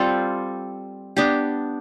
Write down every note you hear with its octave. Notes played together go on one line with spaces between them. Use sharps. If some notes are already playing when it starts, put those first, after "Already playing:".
Already playing: G3 C4 F4 A4
B3 D4 G4